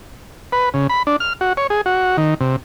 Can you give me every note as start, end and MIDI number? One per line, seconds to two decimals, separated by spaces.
0.52 0.69 71
0.74 0.87 49
0.90 1.03 83
1.07 1.16 62
1.20 1.33 89
1.41 1.53 66
1.57 1.67 73
1.70 1.81 68
1.86 2.17 66
2.17 2.34 51
2.41 2.56 48